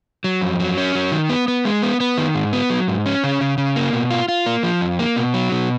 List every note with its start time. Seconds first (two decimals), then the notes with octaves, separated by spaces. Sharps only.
0.24 F#3
0.41 F2
0.60 F#3
0.77 C#4
0.95 F#3
1.12 D#3
1.29 B3
1.48 B3
1.65 G#3
1.83 B3
2.00 B3
2.17 D#3
2.35 G#2
2.53 B3
2.70 F#3
2.88 G#2
3.06 C#4
3.24 C#3
3.41 C#3
3.58 C#3
3.76 A#3
3.93 B2
4.11 F4
4.28 F4
4.46 A#3
4.63 F3
4.81 F2
4.99 A#3
5.16 B2
5.34 F#3
5.52 B2